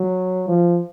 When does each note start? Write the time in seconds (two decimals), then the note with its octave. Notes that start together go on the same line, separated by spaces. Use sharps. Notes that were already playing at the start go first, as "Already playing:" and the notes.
Already playing: F#3
0.48 F3